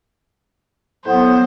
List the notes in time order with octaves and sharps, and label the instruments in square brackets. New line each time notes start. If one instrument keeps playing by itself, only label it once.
[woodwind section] A2 F#3 B3 [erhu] C5